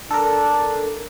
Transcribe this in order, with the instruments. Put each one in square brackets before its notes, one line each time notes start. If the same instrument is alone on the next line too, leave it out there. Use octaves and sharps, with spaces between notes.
[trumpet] D4 [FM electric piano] A4 A#4